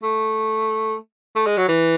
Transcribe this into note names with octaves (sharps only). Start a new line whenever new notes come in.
A3
A3
G#3
F#3
E3